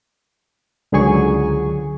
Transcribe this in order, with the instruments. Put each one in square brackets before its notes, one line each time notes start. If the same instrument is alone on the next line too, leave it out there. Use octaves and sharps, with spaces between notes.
[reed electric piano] C#2 D3 F#3 G#4 G#5 C#6